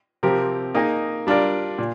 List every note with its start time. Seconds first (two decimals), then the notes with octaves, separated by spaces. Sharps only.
0.23 C3 F3 C4 G4 A#4
0.75 A#3 D#4 G#4 D#5
1.27 G3 D4 F4 A#4 D5
1.79 A#2